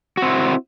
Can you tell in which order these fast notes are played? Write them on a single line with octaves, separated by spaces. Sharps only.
F#4 C4 E4